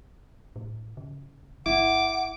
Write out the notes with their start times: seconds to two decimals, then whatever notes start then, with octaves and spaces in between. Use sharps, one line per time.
0.56 A2
0.97 C#3
1.66 G1 E4 F#5 D6